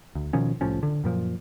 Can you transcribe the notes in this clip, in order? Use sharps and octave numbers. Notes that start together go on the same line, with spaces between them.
D2
B2 D#3 F3 C#4
C2 A2 F3 C#4
D3
F#2 A#2 F3